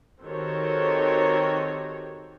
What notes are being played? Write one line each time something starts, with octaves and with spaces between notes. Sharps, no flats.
D#3 C4 F#4 G4 A4 C#5